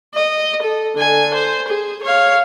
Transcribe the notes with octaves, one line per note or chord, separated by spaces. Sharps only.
D#5
A4
D3 G#5
C5
G#4
C#5 F5